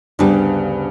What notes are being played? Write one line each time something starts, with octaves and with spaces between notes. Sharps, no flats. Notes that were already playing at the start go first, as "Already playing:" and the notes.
D2 G2 C#3 G3 B3